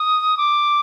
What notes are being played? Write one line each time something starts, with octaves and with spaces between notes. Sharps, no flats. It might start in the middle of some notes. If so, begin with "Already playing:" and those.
Already playing: D#6
D6